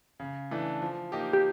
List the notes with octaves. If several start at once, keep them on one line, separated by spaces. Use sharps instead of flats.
C#3
E3 A3 D4
F3
A#3 D#4 G4
G4